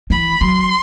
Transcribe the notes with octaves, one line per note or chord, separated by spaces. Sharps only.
E3 B5
F#3 C6